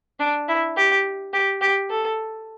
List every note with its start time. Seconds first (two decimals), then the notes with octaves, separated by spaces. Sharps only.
0.20 D4
0.49 E4
0.77 G4
1.33 G4
1.61 G4
1.90 A4